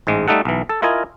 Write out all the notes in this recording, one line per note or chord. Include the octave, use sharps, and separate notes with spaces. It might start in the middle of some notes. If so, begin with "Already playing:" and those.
A1 G#2 G#3
G3 A3 D#4 A4 F#5
B1 E3
A4
E4 F4 A#4 D#5 G#5